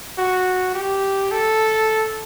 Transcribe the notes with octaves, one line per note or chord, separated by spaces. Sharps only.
F#4
G4
A4